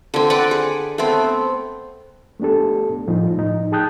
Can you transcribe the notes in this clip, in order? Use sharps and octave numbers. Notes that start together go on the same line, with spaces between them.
D3 C4
B4 D5 F#5 G5
G#4
A3 B3 C4
A3 B3 D4 G4 A4
A2 F3 A3 D#4 F4
A2 F3 D#4
G#4 G5 A5 D#6 F#6 G6